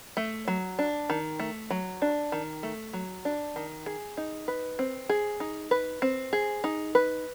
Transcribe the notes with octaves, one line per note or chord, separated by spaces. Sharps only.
A3
F#3
D4
D#3
A3
F#3
D4
D#3
A3
F#3
D4
D#3
G#4
D#4
B4
C4
G#4
D#4
B4
C4
G#4
D#4
B4